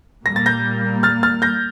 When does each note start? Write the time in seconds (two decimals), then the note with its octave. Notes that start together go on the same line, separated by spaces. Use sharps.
0.25 A#2 G3 A#3 A#6
0.36 A6
0.46 G6 A#6
1.03 F6 A6
1.23 F6 A6
1.42 G6 A#6